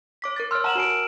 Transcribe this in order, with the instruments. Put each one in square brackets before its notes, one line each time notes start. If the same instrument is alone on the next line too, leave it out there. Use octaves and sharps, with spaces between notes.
[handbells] C#5 D6 B6
A#4 D6 A6
[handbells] C#5 C6 [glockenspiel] E6 F6
[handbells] C#5 F#5 A#5 [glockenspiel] A5 E7 F#7
[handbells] F#4 A#4 [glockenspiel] G#5 D7